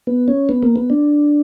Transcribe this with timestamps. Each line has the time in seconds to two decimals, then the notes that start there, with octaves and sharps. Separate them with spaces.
0.07 B3
0.28 C#4
0.49 B3
0.63 A#3
0.76 B3
0.90 D4